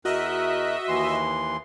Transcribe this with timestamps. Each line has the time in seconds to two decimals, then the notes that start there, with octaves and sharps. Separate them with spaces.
0.05 E2 F#4 A#4 D#5 E5 F#6
0.88 D#2 E3 C6